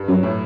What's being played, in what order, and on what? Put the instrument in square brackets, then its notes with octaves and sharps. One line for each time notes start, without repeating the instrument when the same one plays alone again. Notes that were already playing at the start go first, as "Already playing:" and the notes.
Already playing: [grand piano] G2
[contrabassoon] F#2 [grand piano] F#3
[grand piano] A2